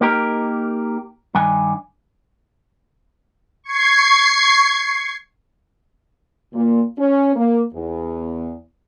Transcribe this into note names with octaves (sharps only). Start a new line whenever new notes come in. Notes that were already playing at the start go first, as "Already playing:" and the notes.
A#3 D#4 G4 A#4
G2 D#3 D4 G#5
C#6 G#6 C7
A#2
C#4
A#3
E2